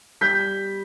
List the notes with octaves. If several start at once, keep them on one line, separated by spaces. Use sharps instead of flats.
G3 G6 B6